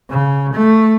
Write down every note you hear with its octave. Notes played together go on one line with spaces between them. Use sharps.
C#3
A3